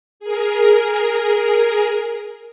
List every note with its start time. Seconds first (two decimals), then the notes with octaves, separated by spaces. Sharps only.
0.20 G#4 A#4